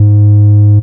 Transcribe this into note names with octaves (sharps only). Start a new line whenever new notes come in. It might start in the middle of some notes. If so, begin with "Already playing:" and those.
Already playing: G#2